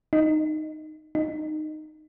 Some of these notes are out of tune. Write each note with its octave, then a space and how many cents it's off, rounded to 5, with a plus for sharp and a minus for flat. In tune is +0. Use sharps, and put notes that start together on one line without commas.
D#4 -5
D#4 -15